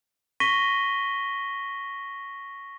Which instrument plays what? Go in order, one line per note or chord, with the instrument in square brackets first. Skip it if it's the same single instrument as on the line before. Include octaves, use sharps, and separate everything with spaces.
[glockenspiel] C#6 A#6 B6 D#7 G7